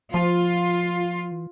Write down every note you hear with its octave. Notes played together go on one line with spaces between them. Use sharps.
F3 F4
E3